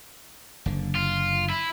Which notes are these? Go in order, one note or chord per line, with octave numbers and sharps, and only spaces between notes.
F#1 D3
F4
E4